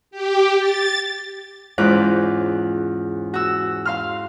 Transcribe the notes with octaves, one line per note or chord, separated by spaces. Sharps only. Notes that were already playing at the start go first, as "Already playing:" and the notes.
G4
A6
E2 G#2 C#4 F4 D6 F#6
F#4 E6
F5 C6 F6